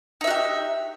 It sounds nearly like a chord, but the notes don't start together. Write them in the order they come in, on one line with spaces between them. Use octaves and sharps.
D#4 E5 F#4 G4